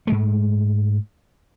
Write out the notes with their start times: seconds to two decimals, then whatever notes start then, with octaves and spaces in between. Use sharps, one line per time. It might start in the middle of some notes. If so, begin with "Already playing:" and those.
0.07 G#2 G#3 A3